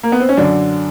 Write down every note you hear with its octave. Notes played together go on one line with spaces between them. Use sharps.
A#3
B3
C4
C#4
F#2 D3 D4